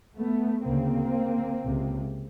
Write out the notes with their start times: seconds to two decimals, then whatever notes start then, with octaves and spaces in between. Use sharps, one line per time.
0.17 A3 B3
0.64 D2 C#3 A#3 C4
1.61 C#2 C3